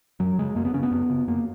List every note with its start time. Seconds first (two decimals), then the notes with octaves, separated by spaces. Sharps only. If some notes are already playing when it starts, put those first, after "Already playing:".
0.20 F#2 F#3
0.38 C#3 G#3
0.56 F#2 A#3
0.65 B3
0.74 C#3 C#4
0.83 B3
0.91 F#2
1.10 C#3
1.27 F#2 A#3